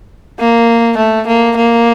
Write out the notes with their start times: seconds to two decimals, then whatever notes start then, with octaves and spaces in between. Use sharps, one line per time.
0.40 A#3
0.98 A3
1.27 A#3
1.57 A#3